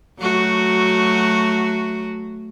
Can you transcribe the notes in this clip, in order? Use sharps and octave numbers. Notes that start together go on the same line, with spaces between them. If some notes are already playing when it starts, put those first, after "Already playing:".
F#3 A3 F#4